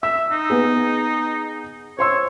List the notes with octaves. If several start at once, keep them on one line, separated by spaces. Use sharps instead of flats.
E5 E6
D#4
B3 G#4
C5 C#5 C6 E6